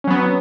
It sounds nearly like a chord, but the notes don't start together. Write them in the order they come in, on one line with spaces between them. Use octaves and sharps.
C#4 F#3 B3